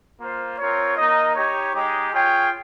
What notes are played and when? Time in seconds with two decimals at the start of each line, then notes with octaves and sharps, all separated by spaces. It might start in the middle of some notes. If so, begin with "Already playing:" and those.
0.19 A#3 F4 C5
0.58 C4 F4 A#4 C#5
0.96 A#3 D#4 A#4 D#5
1.35 D#4 G4 C#5
1.74 G#3 D#4 G4
2.12 F4 G#4 C#5 G5